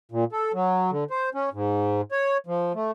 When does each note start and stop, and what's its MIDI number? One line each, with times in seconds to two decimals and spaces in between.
0.12 0.24 46
0.32 0.52 69
0.54 0.91 54
0.91 1.04 50
1.10 1.29 72
1.34 1.49 61
1.53 2.01 44
2.12 2.37 73
2.47 2.73 53
2.74 2.91 57